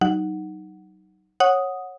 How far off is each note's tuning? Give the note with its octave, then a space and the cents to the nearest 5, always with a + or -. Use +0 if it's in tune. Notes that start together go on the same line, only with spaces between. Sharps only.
F#3 +30 D#4 +0 F#5 +0
C#5 -15 F#5 -5 D#6 +0